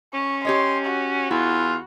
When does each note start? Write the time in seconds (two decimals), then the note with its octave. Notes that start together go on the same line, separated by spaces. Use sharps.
0.14 C#4 C#6
0.45 G4 C#5 D#5 C6
0.86 F#4
1.31 E2 E4 F4